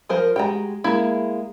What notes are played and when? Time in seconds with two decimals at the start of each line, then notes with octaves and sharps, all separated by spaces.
0.09 F3 A#4 C5
0.36 G#3 F#4 G4 G5 A#5
0.84 G#3 A#3 E4